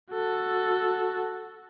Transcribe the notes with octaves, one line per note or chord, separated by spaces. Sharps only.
F#4 A4